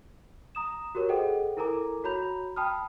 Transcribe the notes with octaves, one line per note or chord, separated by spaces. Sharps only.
A#5 D#6 E7
F#4 G4 A#4 C#5
G#4 A4 C5 D#5 F#5 G5
E4 A4 A#4 G#5 A#5 D6
F#4 C#5 A#5 B5 G6 F7
G5 A5 B5 D#6 F6